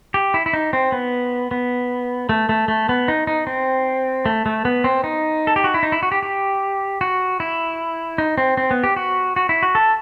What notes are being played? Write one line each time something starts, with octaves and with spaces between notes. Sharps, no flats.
G4
E4
E4
D#4
C4
B3
B3
A3
A3
A3
B3
D#4
D#4
C4
A3
A3
B3
C4
D#4
A4
G4
F#4
E4
D#4
E4
F#4
G4
G4
F#4
E4
D#4
C4
C4
B3
G4
F#4
F#4
E4
F#4
A4